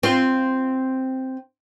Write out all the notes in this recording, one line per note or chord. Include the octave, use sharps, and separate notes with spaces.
C4 F4